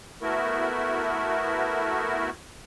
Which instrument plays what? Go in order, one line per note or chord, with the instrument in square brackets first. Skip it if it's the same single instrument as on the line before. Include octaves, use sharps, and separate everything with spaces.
[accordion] A3 B3 E4 F#4 A#4